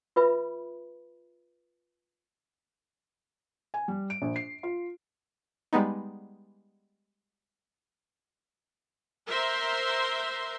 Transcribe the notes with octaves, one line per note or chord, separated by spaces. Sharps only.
F4 B4 E5 B5
G#5
G3
D7
A#1
C7
F4
G3 G#3 B3 D#4
A#4 C5 E5 C6